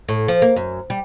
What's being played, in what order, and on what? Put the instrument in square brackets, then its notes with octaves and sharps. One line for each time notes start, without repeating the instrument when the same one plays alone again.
[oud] A2
F3
A#3
F#2
G3